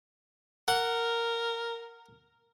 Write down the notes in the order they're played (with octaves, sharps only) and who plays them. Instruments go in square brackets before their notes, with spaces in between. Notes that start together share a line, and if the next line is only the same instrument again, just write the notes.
[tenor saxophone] A#4 [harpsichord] F#5